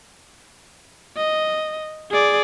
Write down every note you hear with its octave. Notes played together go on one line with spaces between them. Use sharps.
D#5
G#4 D5